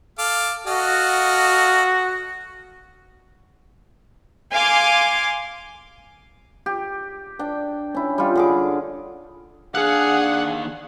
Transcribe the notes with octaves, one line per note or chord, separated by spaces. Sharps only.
A4 F5 D6
F#4 A4 D#5 F5
F5 G#5 C6 D6
G4
D4 G5
C#4 E4
G3 F4
D3 G#4 D6
D#2 D4 G#4 F5 F#5